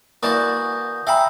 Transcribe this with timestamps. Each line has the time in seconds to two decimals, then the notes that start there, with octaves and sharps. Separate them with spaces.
0.23 D3 E3 A#3 F#4 D5 D#6 G6 A#6
1.07 E5 F5 G5 G#5 A#5 B5 E6